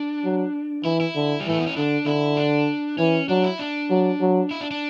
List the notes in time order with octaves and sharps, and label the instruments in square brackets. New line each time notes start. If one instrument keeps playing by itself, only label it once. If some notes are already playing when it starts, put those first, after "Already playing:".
Already playing: [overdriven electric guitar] D4
[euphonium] F#3
[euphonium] E3 [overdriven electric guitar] E4
[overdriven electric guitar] E4
[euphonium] D3
[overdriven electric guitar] G3
[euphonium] E3 [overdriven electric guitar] A3
[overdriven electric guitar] B3
C#4
[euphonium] D3 [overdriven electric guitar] D4
[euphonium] D3 [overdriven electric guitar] E4
[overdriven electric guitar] D4
[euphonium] E3 [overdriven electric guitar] C#4
[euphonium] F#3 [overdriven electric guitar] D4
[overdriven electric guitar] E4
D4
[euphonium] F#3
F#3
[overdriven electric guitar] E4
D4
D4